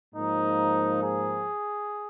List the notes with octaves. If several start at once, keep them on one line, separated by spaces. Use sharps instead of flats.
G#2 F3 A#3 D#4
G#4